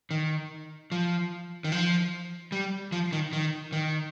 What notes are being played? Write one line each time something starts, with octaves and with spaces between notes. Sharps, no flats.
D#3
F3
D#3
F3
G3
F3
D#3
D#3
D#3